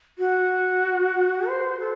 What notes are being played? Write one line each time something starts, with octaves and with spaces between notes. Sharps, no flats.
F#4
C5
A4